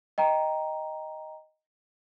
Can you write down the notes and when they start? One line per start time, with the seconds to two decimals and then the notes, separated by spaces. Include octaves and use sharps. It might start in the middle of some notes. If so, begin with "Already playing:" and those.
0.18 D#5 G5 A#5